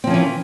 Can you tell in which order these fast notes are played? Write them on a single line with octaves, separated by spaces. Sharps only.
C4 F3 C#4 E3